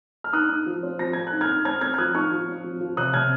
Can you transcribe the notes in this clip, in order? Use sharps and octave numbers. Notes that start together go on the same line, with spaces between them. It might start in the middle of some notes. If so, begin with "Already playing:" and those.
F6
D#4 D#6 F#6
D#4
F3
C4
F3 A#6
C4 G#6
F#6
D#4
F6 G#6
D#4
C4 F6 G#6
C4 F6 G#6
G#6
F3 D#6 F#6
D#4 C#6 F6
F3
C4
F3
F3
C3 D#6 F#6
C3 F6 G#6